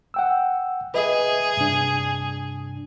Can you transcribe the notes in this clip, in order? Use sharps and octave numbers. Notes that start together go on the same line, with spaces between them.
F#5 G5 E6
G#4 B4 D#5 E5
G2 C3 D4